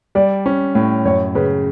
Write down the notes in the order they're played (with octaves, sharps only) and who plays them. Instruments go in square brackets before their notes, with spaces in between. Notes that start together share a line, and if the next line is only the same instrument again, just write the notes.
[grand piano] G3 [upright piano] D5
[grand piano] C#4
A2
[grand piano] F#2 [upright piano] C#5
[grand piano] C#3 [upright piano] B4